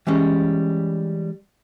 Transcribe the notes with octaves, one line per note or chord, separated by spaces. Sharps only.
E3 G3 G#3 C#4